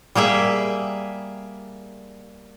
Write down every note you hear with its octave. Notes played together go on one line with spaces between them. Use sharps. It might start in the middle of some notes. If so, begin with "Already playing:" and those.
G3 A#3 G#4 E5